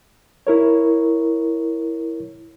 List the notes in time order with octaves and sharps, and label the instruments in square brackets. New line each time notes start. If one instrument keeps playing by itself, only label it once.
[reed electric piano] E4 A#4 C#5